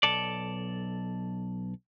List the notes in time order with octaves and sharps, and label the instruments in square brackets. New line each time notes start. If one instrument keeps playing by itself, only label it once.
[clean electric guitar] B1 A4 D5